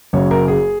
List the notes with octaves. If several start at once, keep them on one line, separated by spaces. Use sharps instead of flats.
F#1 F#2 C#3 C#5
A#4
G#4